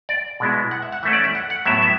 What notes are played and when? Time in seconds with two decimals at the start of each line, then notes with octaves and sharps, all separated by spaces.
0.09 D5
0.40 B2 G#3 B3 E4
0.71 F#5
0.82 E5
0.92 F#5
1.03 E3 A3 C#4 E5
1.13 D5
1.24 E5
1.35 F#5
1.50 F#5
1.66 A2 F#3 B3 E4 E5
1.82 E5